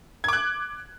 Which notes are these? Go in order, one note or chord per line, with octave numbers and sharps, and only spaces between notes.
D6 F#6 G#6